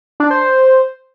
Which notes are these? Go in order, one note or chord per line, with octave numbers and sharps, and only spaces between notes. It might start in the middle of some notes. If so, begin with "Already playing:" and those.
D4
C5
C5